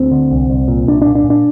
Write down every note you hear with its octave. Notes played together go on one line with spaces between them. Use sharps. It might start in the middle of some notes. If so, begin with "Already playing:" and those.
Already playing: D2 C4
D3
C2
C2
A#2
C2 D4
A#2 D4
D4
A#2
D4